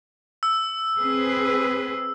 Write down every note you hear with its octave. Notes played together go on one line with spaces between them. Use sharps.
E6
C4 G#4 B4